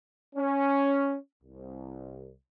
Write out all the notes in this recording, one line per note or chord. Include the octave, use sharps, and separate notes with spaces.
C#4
C2